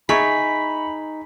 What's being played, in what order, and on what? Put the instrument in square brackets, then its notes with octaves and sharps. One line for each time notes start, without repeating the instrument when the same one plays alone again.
[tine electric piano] D#4 B6 [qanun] G#4 [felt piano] E5 A#5 C#6 [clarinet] B5